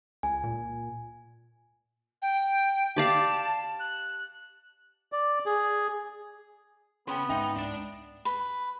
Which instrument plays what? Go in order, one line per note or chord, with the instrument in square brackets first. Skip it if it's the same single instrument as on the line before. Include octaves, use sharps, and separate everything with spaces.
[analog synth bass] C#2 [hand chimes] G#5
[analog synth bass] A#2
[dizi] G5
[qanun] G4 D5 F5 [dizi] A5
[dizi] F#6
[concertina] D5
G#4
[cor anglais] B3 [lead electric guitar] C#4 G#4 [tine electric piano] G5 B5 C6
[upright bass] G#2 [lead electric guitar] D#4 [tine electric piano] E5 G5
[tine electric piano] C#2 [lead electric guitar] D4 D5
[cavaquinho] B4